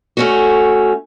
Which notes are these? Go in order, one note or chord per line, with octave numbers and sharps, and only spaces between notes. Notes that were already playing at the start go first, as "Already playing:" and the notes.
A3 C#4 F#4